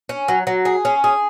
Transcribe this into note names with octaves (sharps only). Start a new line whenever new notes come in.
C#4
F#3
F#3
G#4
C#4
G#4